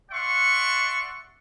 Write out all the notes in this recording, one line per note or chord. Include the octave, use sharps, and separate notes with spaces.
D5 E5 F#5 C6 C#6